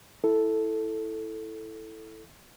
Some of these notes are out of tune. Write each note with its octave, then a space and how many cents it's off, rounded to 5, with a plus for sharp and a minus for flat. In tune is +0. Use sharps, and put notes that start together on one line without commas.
E4 +0 A4 +0